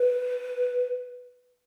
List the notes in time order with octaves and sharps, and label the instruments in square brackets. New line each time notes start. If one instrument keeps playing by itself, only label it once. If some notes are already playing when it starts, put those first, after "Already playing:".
Already playing: [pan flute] B4